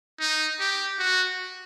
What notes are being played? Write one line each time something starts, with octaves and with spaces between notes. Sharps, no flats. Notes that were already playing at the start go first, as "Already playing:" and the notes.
D#4
G4
F#4